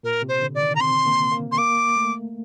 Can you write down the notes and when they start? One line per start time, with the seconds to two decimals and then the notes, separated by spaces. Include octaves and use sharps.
0.03 A#2 A#4
0.22 C3
0.29 C5
0.42 D3
0.55 D5
0.61 D#3
0.75 A#5
0.80 C4 C6
1.06 A#3
1.32 A#3
1.52 C6
1.58 A#3 D6
1.96 A3